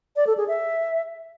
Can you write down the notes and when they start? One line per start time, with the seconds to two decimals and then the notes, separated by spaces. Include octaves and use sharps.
0.16 D5
0.27 A4
0.37 G#4
0.48 E5